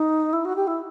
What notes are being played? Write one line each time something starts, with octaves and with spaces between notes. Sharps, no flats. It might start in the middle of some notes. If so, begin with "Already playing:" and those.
Already playing: D#4
E4
F#4
G4
E4